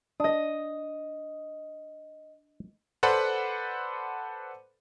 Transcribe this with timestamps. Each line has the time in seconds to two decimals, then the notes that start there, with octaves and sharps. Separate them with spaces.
0.20 D4 D#5 D#6
3.03 A4 B4 C5 D5 F#5 B5